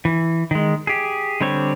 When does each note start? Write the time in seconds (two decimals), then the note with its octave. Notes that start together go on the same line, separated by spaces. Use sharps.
0.05 E3
0.51 D#3 G#3
0.87 G4 G#4
1.41 D3 G3 C4 C#5